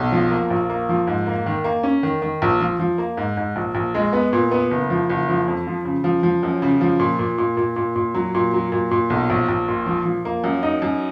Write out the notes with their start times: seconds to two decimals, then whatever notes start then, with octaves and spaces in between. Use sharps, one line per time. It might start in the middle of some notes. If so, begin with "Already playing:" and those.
Already playing: B1
0.12 F3
0.31 A#3
0.50 A#1
0.69 A#3
0.89 F3
1.07 G#2
1.27 A#3
1.46 D#3
1.64 A#3
1.83 C#4
2.03 D#3
2.22 D#3
2.42 A#1
2.60 F3
2.79 F3
2.98 A#3
3.17 G#2
3.37 G#2
3.56 A#1
3.75 A#1
3.95 G#3
4.13 B3
4.33 A#2
4.51 B3
4.71 F#1
4.90 F3
5.10 F#1
5.28 F3
5.48 F2
5.67 F3
5.85 C#3
6.04 F3
6.23 F3
6.43 F#2
6.62 C#3
6.81 F3
7.00 A#2
7.19 A#2
7.38 A#2
7.57 A#2
7.76 A#2
7.96 A#2
8.15 F#3
8.35 A#2
8.54 F#3
8.72 A#2
8.91 A#2
9.10 B1
9.30 A#1
9.49 A#1
9.68 A#2
9.86 F3
10.05 F3
10.25 A#3
10.44 F#2
10.63 D#4
10.82 F#2